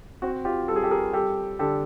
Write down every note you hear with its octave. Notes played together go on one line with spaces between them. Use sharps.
C4 F#4
F4 G4
G3 A4
G#4
G4 A4
G#4 A#4
G3 G4 A4
D3 G4 A4